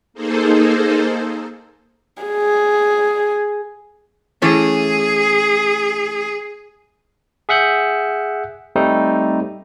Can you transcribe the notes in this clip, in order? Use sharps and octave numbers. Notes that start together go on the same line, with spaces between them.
A#3 D#4 G#4 A4 C5
G#4
E3 A3 C#4 G#4
G#4 E5 F#5 F#6 G6
G3 A3 C4 D#4